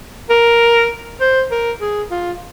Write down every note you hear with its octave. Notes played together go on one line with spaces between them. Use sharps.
A#4
C5
A#4
G#4
F4